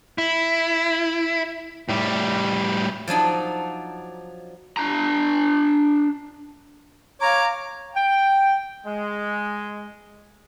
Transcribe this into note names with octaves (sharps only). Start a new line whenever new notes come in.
E4
A2 G3
F3 F#3 D4 D#4
D4 A#5
C#5 F5 A#5 D6
G5
G#3